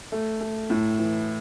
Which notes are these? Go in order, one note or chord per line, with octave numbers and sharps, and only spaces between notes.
A3
A3
A2
E3